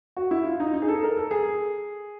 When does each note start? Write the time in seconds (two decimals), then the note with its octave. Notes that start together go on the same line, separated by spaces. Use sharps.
0.17 F#4
0.31 E4
0.45 F4
0.60 D#4
0.74 D#4
0.82 G#4
0.88 A4
1.03 A#4
1.17 A4
1.31 G#4